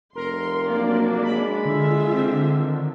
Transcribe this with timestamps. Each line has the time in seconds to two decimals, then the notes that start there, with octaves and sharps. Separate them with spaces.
0.15 F1 A#4 C6
0.70 F#3 A#3 D4 D5
1.23 G#3 B5
1.65 D3 F4 E5
2.12 D3 C4
2.58 D#3